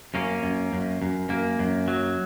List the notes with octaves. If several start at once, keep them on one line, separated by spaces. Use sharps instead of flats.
F#2 A#3 C#4
F#2
F#2
F#2
F#2 A#3
F#2
F#3